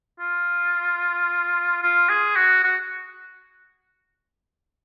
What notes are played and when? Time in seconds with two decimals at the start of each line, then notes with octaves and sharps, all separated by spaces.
0.20 F4
1.82 F4
2.09 G#4
2.36 F#4
2.63 F#4